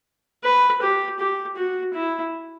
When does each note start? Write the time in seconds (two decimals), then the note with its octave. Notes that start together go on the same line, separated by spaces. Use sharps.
0.44 B4
0.82 G4
1.19 G4
1.57 F#4
1.94 E4